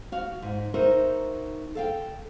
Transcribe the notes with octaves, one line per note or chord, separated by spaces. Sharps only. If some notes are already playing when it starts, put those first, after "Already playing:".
F#4 F5
G#2
D#4 F#4 A#4 C5 E5
A4 F5 G5